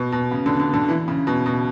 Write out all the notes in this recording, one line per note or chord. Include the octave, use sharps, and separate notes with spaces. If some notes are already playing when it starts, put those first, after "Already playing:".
Already playing: B2
B2
C#3
D3
D3
D3
E3
C#3
B2
B2